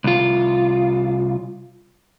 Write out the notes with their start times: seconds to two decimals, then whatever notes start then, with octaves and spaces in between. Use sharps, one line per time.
0.04 C2 F4